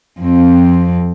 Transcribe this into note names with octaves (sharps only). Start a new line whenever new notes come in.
F2 C4